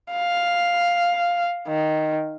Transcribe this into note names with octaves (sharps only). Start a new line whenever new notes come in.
F5
D#3